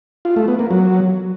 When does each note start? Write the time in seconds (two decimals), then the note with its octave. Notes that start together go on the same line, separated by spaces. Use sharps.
0.25 F4
0.36 A3
0.48 B3
0.59 A#3
0.71 F#3